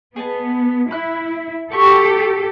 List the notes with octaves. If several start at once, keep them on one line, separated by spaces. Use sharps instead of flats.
B3 G#4 D#5 A5
E4 B5 F#6
F#4 G4 A4 C#6